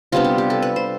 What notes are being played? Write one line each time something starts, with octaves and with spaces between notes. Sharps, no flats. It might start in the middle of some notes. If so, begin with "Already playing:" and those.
C3 G3 B3 D4 F4
G4
G4
A4
B4
C5